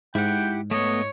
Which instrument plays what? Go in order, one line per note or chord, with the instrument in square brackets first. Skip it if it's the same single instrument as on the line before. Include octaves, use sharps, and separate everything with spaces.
[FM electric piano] G#2 [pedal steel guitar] E4 G4 F#5 [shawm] G5
[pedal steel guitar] A3 B3 [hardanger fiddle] C#5 [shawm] D#5